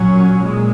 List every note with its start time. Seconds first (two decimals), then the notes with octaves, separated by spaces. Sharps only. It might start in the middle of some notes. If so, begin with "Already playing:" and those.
Already playing: A#2 F#3 C#4
0.41 A#2 G#3